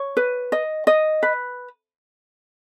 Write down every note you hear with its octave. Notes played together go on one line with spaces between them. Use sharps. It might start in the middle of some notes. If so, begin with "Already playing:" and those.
Already playing: C#5
B4
D#5
D#5
B4